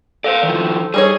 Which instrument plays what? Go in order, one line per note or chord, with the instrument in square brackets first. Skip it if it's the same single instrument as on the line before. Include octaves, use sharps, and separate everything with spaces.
[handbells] A4 C5 [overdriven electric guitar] D5 F5
[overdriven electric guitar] D#3 F3
[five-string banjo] G3 D#4 C#5 [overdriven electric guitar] G#4